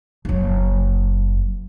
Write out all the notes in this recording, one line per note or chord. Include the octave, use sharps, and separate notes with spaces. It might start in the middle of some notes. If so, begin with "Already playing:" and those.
F#1 F#3